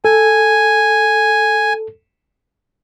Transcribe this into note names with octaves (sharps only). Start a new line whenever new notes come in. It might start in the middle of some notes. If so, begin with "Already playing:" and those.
A4 G#5